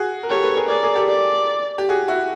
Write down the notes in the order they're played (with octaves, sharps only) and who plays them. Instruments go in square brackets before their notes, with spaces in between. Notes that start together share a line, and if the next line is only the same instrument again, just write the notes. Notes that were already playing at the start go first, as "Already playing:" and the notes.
Already playing: [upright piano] F#4 G#4
A#4
[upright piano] G4 A4 [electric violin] C#5
[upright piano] A4 B4
G#4 A#4
[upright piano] G#4 A#4 [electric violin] D5
[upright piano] G#4 A#4
G4 A4
[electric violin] D5
[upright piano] G4
F#4 G#4
E4 F#4